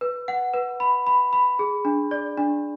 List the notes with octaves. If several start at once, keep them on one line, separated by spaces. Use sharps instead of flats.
B4
F#5
B4
B5
B5
B5
G#4
D4
D5
D4